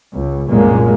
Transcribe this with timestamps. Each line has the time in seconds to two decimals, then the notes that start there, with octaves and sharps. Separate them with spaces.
0.13 C#2
0.50 C2 F#2 A#2 G#3 A#3